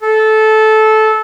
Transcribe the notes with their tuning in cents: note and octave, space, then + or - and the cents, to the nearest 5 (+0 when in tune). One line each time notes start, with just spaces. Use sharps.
A4 -15